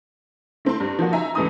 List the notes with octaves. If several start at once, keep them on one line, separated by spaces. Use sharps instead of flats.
A3 C4 E4 C6
G2
F3 A#3 F#4
D#4 E5 G#5 A#5
C#2 G2 E3 A3 D#6